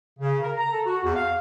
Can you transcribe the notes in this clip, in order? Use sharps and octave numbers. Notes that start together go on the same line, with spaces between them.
C#3
A#4
A#5
A4
F#4
E2
F5